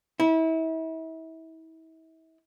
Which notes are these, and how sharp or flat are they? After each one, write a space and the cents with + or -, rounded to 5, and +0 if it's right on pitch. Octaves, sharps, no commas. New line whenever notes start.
E4 -35